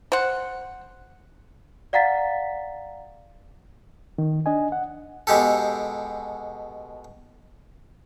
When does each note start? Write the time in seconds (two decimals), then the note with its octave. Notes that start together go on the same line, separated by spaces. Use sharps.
0.12 C5 F#5
1.93 D5 F5 F#5 A#5 A6 B6
4.18 D#3
4.46 D4 D#5 G#5
4.72 F#5
5.27 B2 G#3 G4 A4